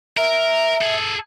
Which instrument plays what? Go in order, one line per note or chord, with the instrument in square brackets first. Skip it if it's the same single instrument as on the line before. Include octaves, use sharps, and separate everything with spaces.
[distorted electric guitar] A#4 [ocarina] E5
[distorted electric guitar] G#4 A4